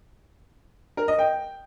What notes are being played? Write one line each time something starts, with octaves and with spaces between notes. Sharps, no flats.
A#4
D#5
G5